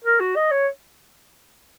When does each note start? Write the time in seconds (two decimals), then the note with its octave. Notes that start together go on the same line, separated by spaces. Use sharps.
0.04 A#4
0.20 F#4
0.36 D#5
0.51 C#5